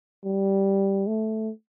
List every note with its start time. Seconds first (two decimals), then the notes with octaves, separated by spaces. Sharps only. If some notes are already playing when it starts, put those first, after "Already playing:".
0.24 G3
1.07 A3